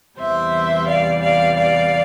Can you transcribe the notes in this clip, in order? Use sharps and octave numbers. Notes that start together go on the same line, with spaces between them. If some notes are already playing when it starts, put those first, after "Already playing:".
E2 C3 E3 G3 C5 E5
D5 F5
D5 F5
D5 F5